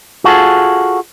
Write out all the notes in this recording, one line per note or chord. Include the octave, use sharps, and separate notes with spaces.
F4 F#4 G#4 A4